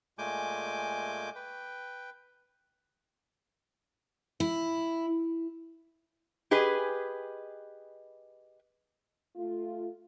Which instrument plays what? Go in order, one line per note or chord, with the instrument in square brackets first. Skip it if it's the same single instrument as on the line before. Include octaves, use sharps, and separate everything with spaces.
[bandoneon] A#2 G#3 A3 G#5 D6 G6
B4 G5
[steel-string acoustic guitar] E4
[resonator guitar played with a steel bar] G4 G#4 B4 D#5 G#5
[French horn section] A3 F4